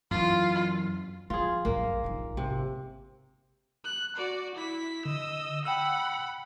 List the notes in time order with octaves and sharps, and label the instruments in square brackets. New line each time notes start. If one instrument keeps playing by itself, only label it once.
[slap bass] F#2 E3 [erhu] F4
[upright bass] F3 [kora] F4 G#4
[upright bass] A#1 F#2 [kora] A#3
[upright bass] A#1 D#3
[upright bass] G#1 [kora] C3
[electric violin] F#6
F#4 D5
E4 B6
[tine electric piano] D3 [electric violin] D#5 E6
[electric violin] F#5 B5 [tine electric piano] G5 E6